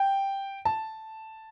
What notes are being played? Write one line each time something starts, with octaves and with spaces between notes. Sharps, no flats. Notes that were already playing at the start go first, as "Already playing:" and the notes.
Already playing: G5
A5